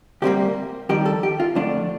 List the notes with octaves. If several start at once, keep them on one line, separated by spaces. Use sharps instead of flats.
D2 C3 G3 A#3 G4
F2 D#3 G3 G4
A4
G4
F4
F2 D3 A3 D4 D5